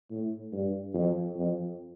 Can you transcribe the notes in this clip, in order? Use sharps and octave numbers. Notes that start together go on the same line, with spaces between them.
A2
G2
F2
F2